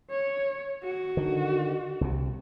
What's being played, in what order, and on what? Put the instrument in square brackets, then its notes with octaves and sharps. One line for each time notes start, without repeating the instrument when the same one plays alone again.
[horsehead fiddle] C#5
F#4
[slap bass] D3 D#3
C2 C3